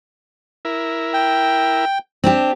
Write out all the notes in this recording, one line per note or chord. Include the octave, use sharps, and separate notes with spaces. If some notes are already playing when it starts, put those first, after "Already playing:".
E4 A#4
G5
C4 D4 G4